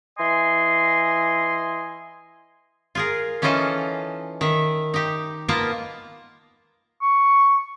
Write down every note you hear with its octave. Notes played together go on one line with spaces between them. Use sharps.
E3 D#5 G#5 C6
F4 G#4 A#4
E3 C#4 D#4 F4 A4 D#5
D#3 E5
D#4 G4
A#3 B3 F4 A#4 A5 A#5
C#6